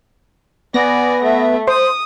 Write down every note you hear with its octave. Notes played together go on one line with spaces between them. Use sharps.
B3 D5 G#5 A#6
A3 E5
C5 D#6